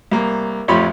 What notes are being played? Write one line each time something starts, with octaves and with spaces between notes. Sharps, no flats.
C2 A#3
A1 F2 F4 C#5 B5 C6